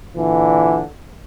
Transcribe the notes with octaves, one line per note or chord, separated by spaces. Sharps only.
A#2 D3 E3